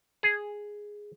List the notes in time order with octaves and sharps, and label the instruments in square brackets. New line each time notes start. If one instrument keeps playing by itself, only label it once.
[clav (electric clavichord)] G#4